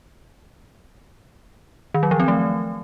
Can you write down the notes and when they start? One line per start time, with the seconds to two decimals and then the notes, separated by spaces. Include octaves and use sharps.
1.94 D#3
2.03 F#3
2.11 F3
2.20 C4
2.28 A3